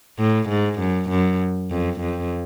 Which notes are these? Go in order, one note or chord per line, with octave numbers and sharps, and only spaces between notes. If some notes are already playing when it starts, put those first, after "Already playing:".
A2
G#2
F#2
F#2
F2
F2